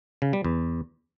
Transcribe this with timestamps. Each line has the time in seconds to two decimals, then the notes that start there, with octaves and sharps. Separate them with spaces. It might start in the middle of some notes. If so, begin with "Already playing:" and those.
0.22 C#3
0.33 G3
0.44 E2